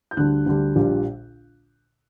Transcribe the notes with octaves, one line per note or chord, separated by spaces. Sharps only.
G6
D2 D3 G3 F#6
D2 D3 G3
A#1 A#2 G3